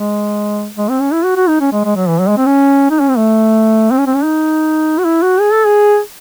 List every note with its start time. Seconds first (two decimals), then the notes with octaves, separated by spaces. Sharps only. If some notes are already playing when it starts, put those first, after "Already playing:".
Already playing: G#3
0.77 G#3
0.89 C4
1.01 C#4
1.13 E4
1.24 F#4
1.36 F#4
1.49 D#4
1.60 C#4
1.72 G#3
1.84 G#3
1.96 F#3
2.08 E3
2.20 F#3
2.28 G#3
2.37 C4
2.46 C#4
2.91 D#4
3.00 C#4
3.09 C4
3.18 A3
3.91 C4
3.98 C#4
4.07 C4
4.15 C#4
4.24 D#4
4.98 F#4
5.05 E4
5.22 F#4
5.40 G#4
5.52 A4
5.66 G#4